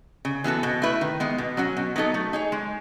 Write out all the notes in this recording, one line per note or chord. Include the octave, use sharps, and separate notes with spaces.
C#3
E3 B3 F#4 A4
B2
A3 E4 B4
D#3
G#3 B3
B2
F#3 C#4 F#4
B2
F#3 B3 D#4 A4
A3
D#4 G#4 C#5
G#3